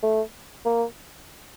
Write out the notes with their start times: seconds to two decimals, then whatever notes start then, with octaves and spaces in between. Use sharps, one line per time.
0.03 A3
0.65 A#3